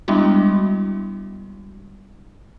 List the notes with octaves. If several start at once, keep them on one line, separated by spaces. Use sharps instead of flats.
G3 G#3 B3 D4 E4 F#4